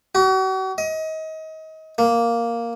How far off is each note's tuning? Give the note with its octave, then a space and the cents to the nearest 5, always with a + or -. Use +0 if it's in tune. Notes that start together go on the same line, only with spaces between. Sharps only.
F#4 +40
D#5 +30
A#3 +0